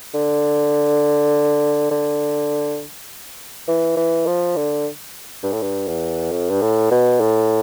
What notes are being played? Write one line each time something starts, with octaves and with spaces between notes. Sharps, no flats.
D3
D3
E3
E3
F3
D3
G2
A2
G2
E2
F2
G2
A2
B2
A2